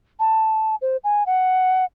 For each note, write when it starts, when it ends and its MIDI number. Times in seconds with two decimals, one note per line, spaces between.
0.20 0.75 81
0.82 0.97 72
1.04 1.26 80
1.26 1.85 78